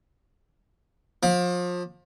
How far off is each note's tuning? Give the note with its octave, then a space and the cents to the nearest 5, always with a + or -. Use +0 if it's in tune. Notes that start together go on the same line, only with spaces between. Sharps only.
F3 +30 D6 +0